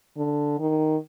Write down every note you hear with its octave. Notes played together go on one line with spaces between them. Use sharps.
D3
D#3